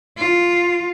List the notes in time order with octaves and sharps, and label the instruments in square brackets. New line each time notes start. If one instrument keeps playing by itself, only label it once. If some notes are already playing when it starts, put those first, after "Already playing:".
[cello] F4